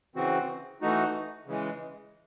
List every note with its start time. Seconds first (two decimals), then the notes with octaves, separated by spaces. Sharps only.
0.15 C#3 E3 C4 F#4
0.82 E3 A3 D#4 F#4
1.46 C#3 E3 G#3